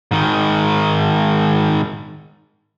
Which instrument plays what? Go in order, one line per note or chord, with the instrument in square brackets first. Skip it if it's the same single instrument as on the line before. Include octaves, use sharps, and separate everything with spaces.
[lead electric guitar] G#2 D#3